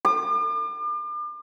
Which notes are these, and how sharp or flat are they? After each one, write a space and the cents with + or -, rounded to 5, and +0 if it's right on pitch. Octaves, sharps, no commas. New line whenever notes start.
D6 +40